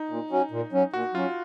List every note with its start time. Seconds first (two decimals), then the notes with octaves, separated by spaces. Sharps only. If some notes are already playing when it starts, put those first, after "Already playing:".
Already playing: D#4
0.09 A#2
0.30 F#3 C#4
0.51 A#2
0.73 F#3 C#4
0.93 A#2 F#4
1.14 F#3 C#4 F4